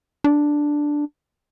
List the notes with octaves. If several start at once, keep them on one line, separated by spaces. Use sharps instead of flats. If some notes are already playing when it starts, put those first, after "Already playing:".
D4